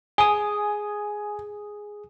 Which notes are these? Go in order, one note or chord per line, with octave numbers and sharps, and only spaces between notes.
G#4 G#5 D#6